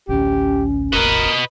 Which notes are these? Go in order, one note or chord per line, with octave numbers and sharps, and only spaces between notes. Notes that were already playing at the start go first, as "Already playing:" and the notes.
A1 D2 C#4 G4
E1 A1 A#4 B4 D#5